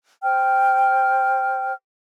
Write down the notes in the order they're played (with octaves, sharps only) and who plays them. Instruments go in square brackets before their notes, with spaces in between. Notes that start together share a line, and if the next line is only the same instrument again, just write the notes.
[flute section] C5 G5 F6